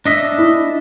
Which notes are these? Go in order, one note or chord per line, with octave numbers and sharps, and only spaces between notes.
D4 D#5 E5
E4